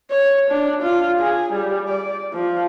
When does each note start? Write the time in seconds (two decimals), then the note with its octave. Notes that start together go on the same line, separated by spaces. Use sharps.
0.11 C#5
0.51 D4
0.82 F4
1.20 G#4
1.53 G3
1.88 D5
2.33 F3